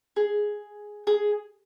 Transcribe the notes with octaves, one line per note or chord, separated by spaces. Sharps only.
G#4
G#4